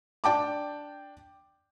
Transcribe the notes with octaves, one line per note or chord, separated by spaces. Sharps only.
D4 G5 A5 D6